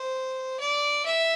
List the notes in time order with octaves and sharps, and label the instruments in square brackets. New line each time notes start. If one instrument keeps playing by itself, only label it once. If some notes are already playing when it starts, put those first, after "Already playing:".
Already playing: [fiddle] C5
D5
E5